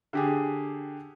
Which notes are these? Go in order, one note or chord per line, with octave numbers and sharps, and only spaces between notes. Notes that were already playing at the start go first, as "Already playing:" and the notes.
D3 G4 G#4